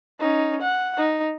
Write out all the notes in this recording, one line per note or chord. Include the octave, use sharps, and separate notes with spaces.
C#4 D#4
F#5
D#4